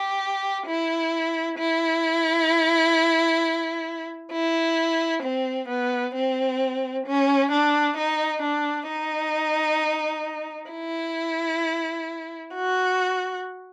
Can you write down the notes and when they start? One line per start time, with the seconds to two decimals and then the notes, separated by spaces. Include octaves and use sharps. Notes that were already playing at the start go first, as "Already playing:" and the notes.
Already playing: G4
0.66 E4
1.58 E4
4.32 E4
5.24 C4
5.69 B3
6.15 C4
7.07 C#4
7.52 D4
7.98 D#4
8.43 D4
8.89 D#4
10.71 E4
12.54 F#4